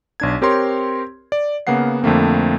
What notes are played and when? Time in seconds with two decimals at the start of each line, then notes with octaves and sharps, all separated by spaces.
0.20 B1 D4 G#6
0.42 C4 G4 A#4 C#5 C6
1.32 D5
1.67 C#3 A#3 B3 F#5 C7
2.03 F2 D3 A3 A#3 C4